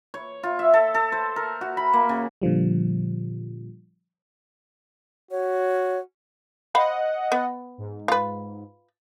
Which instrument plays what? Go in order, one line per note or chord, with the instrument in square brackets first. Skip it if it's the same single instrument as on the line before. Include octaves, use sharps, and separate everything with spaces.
[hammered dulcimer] C#5
F4
E5
A4
A4
C5
A#4
F#4
B5
A#3
C#3
[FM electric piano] A#2 D3 F3 G3
[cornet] F#4 [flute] C#5
[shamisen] C5 F5 B5 [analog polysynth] D#5 F#5
[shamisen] B3
[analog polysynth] G#2
[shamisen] F4 B4